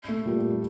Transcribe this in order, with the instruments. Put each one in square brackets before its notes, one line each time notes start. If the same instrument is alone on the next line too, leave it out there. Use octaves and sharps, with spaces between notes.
[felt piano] A3
[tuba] A#2 [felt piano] G3
[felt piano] G3